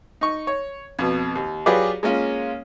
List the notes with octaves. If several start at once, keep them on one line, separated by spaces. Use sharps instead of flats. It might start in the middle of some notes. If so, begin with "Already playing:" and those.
D#4 C#6
C#5
F2 B2
D#2
F#3 F4 G4 G#4 B4 D5
G#3 A#3 C#4 F4